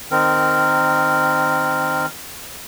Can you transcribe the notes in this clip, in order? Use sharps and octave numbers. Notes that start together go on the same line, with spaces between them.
D#3 C4 A#4